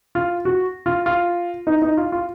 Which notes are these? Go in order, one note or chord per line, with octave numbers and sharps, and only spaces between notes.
F4
F#4
F4
F4
D#4
D#4
F4
F4